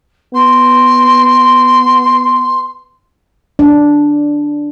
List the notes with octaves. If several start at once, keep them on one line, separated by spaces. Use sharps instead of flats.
B3 C6
D4